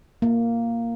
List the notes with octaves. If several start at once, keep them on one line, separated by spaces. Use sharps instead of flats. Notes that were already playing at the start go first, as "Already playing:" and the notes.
A#3